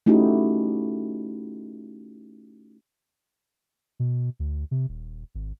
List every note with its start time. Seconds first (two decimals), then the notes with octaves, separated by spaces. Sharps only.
0.06 A3 C#4 D#4 E4 F#4 G4
4.00 B2
4.39 D2
4.71 C3
4.89 D#1
5.35 G#1